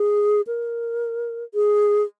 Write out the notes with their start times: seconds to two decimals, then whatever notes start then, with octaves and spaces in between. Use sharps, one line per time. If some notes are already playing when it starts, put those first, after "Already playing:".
Already playing: G#4
0.47 A#4
1.54 G#4